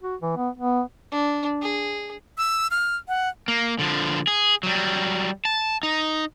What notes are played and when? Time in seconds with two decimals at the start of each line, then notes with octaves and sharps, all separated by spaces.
0.02 F#4
0.22 E3
0.36 B3
0.58 B3
1.11 D4
1.62 G#4
2.38 E6
2.71 F6
3.08 F#5
3.48 A#3
3.79 D3 F3
4.27 G#4
4.63 F#3 G3
5.45 A5
5.83 D#4